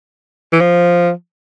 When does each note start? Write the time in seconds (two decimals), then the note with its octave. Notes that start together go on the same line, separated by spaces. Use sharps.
0.53 E3
0.61 F3